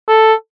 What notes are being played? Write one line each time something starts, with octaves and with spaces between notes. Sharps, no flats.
A4